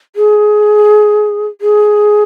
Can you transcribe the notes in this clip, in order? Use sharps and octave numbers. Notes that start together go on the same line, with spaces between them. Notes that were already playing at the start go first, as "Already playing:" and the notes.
G#4
G#4